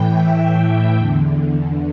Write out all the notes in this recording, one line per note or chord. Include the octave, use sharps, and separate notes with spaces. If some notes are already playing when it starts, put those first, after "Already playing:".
Already playing: A2 E3 G5
E5
E2 D3